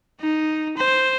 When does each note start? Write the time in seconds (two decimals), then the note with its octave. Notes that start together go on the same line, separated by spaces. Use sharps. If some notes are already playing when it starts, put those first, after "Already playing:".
0.21 D#4
0.78 C5